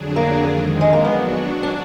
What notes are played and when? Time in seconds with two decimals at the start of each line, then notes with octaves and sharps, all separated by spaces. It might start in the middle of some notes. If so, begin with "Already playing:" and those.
Already playing: F2 D3 F#3 D4 G#4
0.16 A#3
0.45 F2 D#3 G#3
0.81 G#3
0.93 A#3
1.04 F#3 B3 D4 F#4
1.63 D4